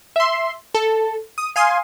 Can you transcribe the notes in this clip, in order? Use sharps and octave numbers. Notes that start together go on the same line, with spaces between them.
E5 C6
A4
D#6
F5 G#5 C6 D#6